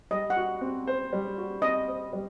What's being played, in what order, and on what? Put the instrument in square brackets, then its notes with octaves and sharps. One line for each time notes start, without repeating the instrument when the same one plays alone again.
[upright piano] G3 [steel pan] D#5
[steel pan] F#5
[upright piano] F#4
C4
C5
G3
F#4
[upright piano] C4 [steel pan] D#5
[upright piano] C5
G3